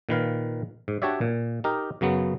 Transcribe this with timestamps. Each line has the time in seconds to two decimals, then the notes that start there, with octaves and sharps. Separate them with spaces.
0.09 A#2 D#3 B4 F5
0.88 G#2
1.02 D4 F#4 G4 C#5 D5 E5
1.21 A#2
1.64 D#4 G4 A#4
2.01 F#2 C#3 F#3 B3